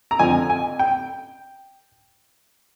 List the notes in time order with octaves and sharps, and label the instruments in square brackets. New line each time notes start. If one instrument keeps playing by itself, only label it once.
[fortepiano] A#5
F2 D3 F3 C4 G#5
G#5
G5